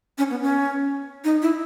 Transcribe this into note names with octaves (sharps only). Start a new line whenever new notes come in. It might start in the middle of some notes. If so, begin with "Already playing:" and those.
C#4
B3
C#4
D#4
E4